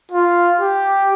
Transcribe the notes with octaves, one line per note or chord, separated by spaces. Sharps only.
F4
G4